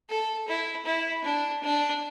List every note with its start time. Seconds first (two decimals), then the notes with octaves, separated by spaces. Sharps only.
0.09 A4
0.48 E4
0.86 E4
1.24 D4
1.63 D4